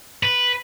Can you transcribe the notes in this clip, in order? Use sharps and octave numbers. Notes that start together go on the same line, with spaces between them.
B4